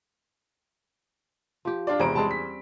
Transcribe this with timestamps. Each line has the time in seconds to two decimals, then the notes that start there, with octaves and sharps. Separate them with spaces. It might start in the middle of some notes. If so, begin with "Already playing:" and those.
1.65 F3 G4
1.87 D4 F4 D5
2.00 E2 G#2 C3 G#4 B4 C5 A#5 D7
2.15 G3 G#3 C4 C#4 A5
2.31 B6